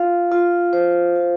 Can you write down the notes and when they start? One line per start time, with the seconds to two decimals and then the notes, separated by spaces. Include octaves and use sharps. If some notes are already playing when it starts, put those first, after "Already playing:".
Already playing: F4 F5
0.32 F4
0.73 C5
1.16 F4